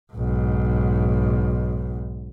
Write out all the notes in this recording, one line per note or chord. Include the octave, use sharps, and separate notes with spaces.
B1 G#2